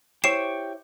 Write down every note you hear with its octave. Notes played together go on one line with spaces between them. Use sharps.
E4 G4 C5 C#5 G5 C#6 C7 E7